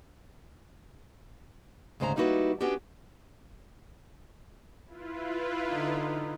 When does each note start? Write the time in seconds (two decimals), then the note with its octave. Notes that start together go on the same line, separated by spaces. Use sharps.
2.00 D2 G#2 C#3 C5 G#5 A#5
2.16 G3 A#3 D#4 E4 F#4 B4
2.61 B3 C#4 D4 F#4 G4
4.86 E4 F4 B4
5.69 D3 D#4